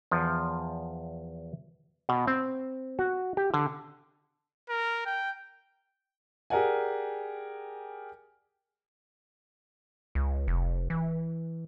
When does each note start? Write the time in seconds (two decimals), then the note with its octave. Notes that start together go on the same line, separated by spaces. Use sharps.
0.11 E2 F3
2.09 B2
2.27 C4
2.99 F#4
3.37 G4
3.54 D3
4.69 A#4
5.06 G5
6.50 G4 G#4 A#4 D5 F#5 G#5
10.15 C#2
10.48 F1
10.90 E3